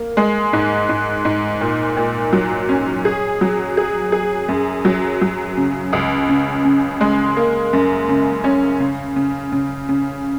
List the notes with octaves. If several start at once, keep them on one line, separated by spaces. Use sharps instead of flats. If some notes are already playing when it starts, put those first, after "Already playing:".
Already playing: A#3
G#3
G#2
G#2
G#2
A#2
A#2
F#3
C#4
G#4
F#3
G#4
G#4
F#2
F#3
F#3
C#3
C#2
C#3
C#3
G#3
A#3
F#2
C#3
C#4
C#3
C#3
C#3
C#3